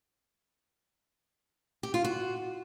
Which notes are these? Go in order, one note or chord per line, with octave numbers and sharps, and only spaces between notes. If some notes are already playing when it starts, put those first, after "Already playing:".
G4
F4
F#4